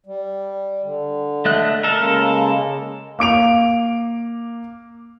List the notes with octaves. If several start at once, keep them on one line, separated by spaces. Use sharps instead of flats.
G3
D3
A3 D#5 F#6
A4 A#4
C#3 G#3 A#3
A#3 D6 D7 F7